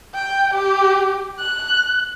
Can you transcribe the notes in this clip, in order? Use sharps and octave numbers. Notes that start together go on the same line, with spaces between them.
G5
G4
F#6